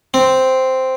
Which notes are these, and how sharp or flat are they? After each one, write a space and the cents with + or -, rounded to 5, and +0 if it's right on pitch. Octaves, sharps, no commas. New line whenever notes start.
C4 -5